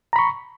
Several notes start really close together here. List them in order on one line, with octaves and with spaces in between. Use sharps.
A#5 B5 C#6